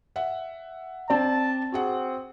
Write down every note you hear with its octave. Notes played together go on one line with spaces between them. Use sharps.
E5 F#5
C4 D5 A5
C4 F#4 G#4 F#5